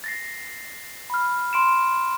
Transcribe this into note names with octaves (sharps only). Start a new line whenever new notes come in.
A6 A#6 C7
B5 F6
C6 D7 E7